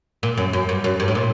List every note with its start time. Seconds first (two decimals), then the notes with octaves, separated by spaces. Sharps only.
0.23 A#2
0.37 F#2
0.53 F#2
0.69 G2
0.84 F#2
1.00 G2
1.08 A2
1.15 A#2